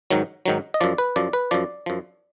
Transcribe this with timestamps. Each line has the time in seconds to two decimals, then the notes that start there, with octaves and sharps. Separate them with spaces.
0.10 G#2 D#3 F#3
0.46 G#2 D#3 F#3
0.74 D#5
0.81 F#2 F3 D5
0.98 B4
1.16 F#2 F3 D5
1.33 B4
1.51 F#2 F3 D5
1.86 F#2 F3